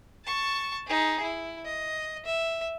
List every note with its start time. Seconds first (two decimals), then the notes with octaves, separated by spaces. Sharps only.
0.25 A5 C#6
0.87 D#4 G#4
1.22 E4
1.65 D#5
2.25 E5